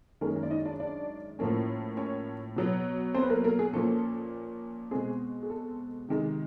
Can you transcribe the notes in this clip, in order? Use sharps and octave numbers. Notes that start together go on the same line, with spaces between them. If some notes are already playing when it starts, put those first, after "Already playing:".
F#2 D#3 G#3 A#3 C#4 A#4
A#3 A#4
D5
D#4 D#5
D4 D5
D4 D5
A2 F3 A#3 C#4
C#4 C#5
B2 F#3 B3
C4 C5
B4
A#3 A#4
A#3 A#4
G#4
A#2 F3 A#3 C#4 A4
B2 G#3 C4 G#4
G#4
A4
C3 D#3 G#3